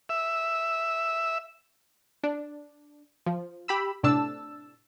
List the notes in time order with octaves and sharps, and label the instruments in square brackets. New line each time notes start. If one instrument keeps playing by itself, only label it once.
[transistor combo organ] E5
[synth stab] D4
F3
G4 B5 E6
A2 C3 D4 A5 E6